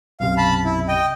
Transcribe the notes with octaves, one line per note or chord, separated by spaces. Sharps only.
B1 F#2 C3 F5
A5 B5
E4
D#5 G5